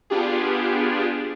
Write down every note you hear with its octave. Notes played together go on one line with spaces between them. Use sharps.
B3 D4 F4 G4 G#4